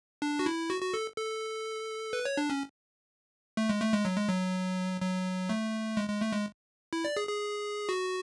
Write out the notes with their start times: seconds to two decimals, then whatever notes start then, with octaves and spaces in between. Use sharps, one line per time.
0.22 D4
0.39 F#4
0.46 E4
0.70 F#4
0.82 F#4
0.94 A4
1.18 A4
2.13 B4
2.25 C#5
2.37 D4
2.50 C#4
3.57 A3
3.69 G#3
3.82 A3
3.93 G#3
4.05 F#3
4.17 G#3
4.28 F#3
5.01 F#3
5.49 A3
5.97 G#3
6.09 G#3
6.21 A3
6.32 G#3
6.93 E4
7.05 D5
7.17 G#4
7.28 G#4
7.89 F#4